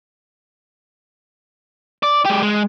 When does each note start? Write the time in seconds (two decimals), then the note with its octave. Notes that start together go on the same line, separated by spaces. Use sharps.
2.03 D5
2.25 G#3 G4
2.43 G#3